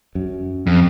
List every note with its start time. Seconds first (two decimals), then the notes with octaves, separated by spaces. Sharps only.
0.15 F#2
0.67 F2